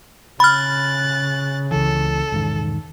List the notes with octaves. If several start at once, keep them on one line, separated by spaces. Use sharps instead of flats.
C#3 B5 F6 F#6 A6
C#2 E3 A4
E1 G#2 D#3